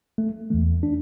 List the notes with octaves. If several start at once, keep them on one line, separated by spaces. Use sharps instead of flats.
A3
E2 E3 A3
D4